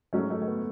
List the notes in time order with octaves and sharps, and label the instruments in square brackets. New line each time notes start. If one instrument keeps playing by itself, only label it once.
[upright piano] G#2 F#3 C#4 F#4 [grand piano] A3
[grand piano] A3
A3
B3